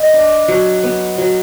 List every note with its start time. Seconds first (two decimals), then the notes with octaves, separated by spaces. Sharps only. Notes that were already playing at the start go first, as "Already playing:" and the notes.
Already playing: D#5
0.14 D4
0.48 F#3
0.83 B3
1.18 F#3